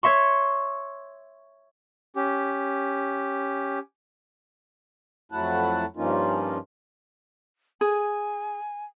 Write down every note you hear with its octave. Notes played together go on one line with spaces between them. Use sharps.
C#5 E5 C6 C#6
C#4 G4
F2 F#3 A3 E4 F#5 A5
G2 F3 A#3 C#4 D#4 F4
G#4 G#5